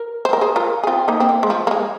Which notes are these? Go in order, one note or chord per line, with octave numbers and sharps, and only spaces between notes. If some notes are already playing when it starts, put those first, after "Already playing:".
Already playing: A#4
C5
A#4
G#4 C5
F4 A#4
G#4
C4 F4
A#3 D#4
C4
A#3
G#3
F3
A#3
G#3